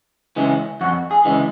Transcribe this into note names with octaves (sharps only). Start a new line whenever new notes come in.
C#3 E3 G#3
F2 F#4
G#4
C#3 E3 G#3